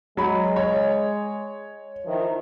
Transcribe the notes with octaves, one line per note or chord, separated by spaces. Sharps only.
F#3 G#3 B5
C#5
D#3 F3 E4